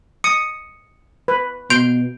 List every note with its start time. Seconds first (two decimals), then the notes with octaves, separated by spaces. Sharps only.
0.24 D#6 C#7
1.28 B4
1.70 B2 C6 G6 D7 F7